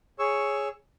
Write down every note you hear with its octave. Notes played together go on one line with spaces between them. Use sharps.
G#4 C#5 C#6 E6